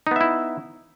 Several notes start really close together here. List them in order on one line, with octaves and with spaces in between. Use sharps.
D#4 B3 E5 E4